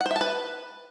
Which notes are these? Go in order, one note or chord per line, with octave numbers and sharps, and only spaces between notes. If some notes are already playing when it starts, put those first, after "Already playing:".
F#5
C5
E5
A5
B4